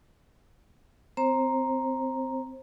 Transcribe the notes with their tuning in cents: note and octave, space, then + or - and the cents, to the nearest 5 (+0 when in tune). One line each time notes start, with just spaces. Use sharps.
C4 -15 C5 +25 A#5 +0